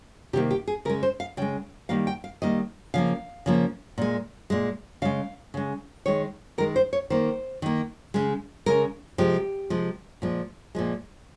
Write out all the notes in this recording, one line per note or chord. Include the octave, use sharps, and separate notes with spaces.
C3 D#3 A#3 G4
G4
G#4
C#3 G#3 A#4
C5
F5
C#3 G#3 G5
D#3 G3 A#3 F5
G5
F5
D#3 G3 A#3 D#5
C#3 F3 A#3 F5
C#3 F3 A#3
A#2 G#3
A#2 G#3
C#3 G#3 F5
C#3 G#3
D#3 G#3 C#5
D#3 G#3 A#4
C5
C#5
D#3 A#3 C5
D#3 A#3
C#3 G#3
C#3 G#3 A#4
C3 F3 G#3 G4
C3 F3 G#3
A#2 F3 G#3
A#2 F3 G#3